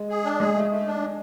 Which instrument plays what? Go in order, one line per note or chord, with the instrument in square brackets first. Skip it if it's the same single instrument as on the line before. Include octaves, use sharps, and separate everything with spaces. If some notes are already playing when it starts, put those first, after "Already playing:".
Already playing: [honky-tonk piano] G#3
[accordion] G#4
D4
[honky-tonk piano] G#3 [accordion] G#4
[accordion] A3
A3
D4